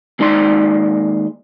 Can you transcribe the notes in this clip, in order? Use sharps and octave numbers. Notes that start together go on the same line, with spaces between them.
D#2 G#3 D#4 D5 C6